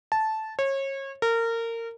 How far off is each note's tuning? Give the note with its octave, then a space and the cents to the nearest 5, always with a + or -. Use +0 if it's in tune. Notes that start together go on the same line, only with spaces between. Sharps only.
A5 -10
C#5 -30
A#4 -25